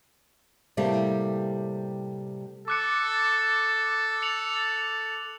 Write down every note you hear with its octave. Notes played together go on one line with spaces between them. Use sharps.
A2 C3 G3 A3 A#3 C4
A4 D6 F#6 C#7
C#7 F7 F#7